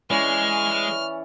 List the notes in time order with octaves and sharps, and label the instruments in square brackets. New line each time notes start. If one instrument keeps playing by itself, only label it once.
[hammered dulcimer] E3 C#4 D5 [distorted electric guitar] G#3 [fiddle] F6